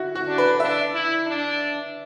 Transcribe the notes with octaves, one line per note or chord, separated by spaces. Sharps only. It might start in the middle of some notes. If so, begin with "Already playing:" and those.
Already playing: E4 F#4
F#4
D4
B4
D4 E5
E4
D4